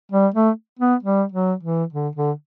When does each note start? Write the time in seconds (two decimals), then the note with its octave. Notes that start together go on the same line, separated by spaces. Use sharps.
0.12 G3
0.34 A3
0.79 B3
1.03 G3
1.32 F#3
1.63 E3
1.93 D3
2.16 D3